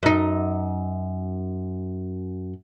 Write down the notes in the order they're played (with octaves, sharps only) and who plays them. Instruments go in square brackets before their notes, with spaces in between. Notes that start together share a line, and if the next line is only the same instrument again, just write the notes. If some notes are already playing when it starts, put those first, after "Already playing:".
[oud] F#2 D#4